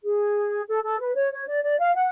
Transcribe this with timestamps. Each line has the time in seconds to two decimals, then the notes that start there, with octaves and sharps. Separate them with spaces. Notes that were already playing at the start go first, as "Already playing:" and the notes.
0.04 G#4
0.68 A4
0.83 A4
1.00 B4
1.15 C#5
1.32 C#5
1.47 D5
1.63 D5
1.79 F5
1.96 F#5